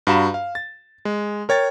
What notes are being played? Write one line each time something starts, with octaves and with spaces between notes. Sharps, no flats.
G2 F#4 F5 A#5 B5 E7
F5
A6
G#3
A#4 C#5 G5 A6